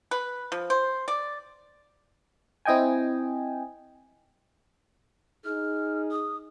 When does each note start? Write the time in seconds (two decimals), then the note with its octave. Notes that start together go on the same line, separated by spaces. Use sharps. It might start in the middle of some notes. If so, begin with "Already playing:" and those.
0.11 B4
0.52 F3
0.70 C5
1.08 D5
2.65 C4 E4 D#5 G5 G#5
5.45 D#4 G#4 F6
6.11 D#6